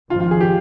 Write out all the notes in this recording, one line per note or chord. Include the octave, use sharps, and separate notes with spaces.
G#1 G#2 F3 F4
F4
G#4
G4